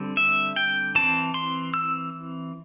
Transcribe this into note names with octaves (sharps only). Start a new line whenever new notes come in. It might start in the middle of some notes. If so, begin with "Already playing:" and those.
Already playing: D3 G3 C4
E5
G5
E3 C4 A5
C6
E6